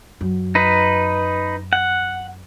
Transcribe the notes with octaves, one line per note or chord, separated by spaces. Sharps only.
F#2
D#4 B4
F#5